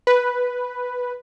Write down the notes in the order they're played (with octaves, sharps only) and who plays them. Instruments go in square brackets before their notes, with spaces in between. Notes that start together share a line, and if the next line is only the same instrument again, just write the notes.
[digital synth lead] B4